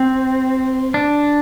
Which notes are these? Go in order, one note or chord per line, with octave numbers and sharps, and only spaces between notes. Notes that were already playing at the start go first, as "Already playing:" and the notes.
Already playing: C4
D4